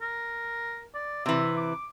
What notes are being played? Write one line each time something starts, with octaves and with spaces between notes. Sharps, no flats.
A#4
D5
C3 E3 E5
D6